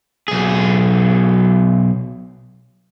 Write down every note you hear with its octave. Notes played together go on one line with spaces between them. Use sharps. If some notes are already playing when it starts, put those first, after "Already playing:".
B1 G#4